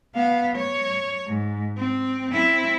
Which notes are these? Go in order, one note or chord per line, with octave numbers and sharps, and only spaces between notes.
B3 F5
C#5
G#2
C4
C4 E4